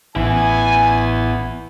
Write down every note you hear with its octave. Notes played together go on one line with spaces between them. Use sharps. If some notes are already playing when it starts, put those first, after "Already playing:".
A1 E3 B3 E4 G#5